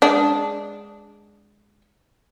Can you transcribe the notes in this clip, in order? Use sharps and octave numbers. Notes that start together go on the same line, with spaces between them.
G#3 D4